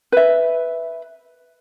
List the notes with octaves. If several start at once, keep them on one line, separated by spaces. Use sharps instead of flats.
B4 E5